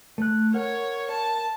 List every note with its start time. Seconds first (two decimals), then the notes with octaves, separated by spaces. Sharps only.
0.18 A3 F#6
0.54 A#4 C#5 F#5
1.11 A5